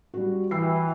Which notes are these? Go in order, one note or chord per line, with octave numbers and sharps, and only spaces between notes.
G3 F#4
E3 G5 E6 C7